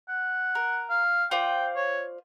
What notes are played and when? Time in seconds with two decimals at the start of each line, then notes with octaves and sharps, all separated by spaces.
0.09 F#5
0.55 A#4
0.90 F5
1.31 F4 C5 D5 G5
1.76 C#5